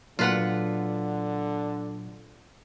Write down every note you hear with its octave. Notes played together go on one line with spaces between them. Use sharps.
A#2 D3 F#3 F4 B4 F#5